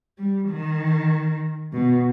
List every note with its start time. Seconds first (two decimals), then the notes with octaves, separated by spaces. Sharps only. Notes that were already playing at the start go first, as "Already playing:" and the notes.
0.18 G3
0.49 D#3
1.73 B2